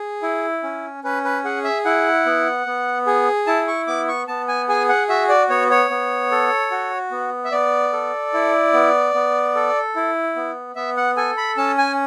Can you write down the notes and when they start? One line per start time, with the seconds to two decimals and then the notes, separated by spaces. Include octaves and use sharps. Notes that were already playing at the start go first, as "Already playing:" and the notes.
Already playing: G#4
0.22 E4
0.63 C#4
1.04 C#4 B4
1.24 B4
1.44 G#4 F#5
1.64 E5
1.85 E4 F#5
2.26 B3
2.66 B3
3.07 G#4
3.47 E4 A5
3.67 C#6
3.87 B3 D6
4.08 C#6
4.28 B3 A5
4.48 G#5
4.69 G#4 G#5
4.89 F#5
5.09 F#4 E5
5.29 D5
5.50 B3 C#5
5.70 C#5
5.90 B3
6.31 A4
6.71 F#4
7.11 B3
7.45 E5
7.52 B3 D5
7.93 A4
8.34 E4
8.73 B3
9.14 B3
9.55 A4
9.96 E4
10.36 B3
10.76 B3 E5
10.97 F#5
11.17 A4 G#5
11.37 B5
11.57 C#4 A5
11.78 G#5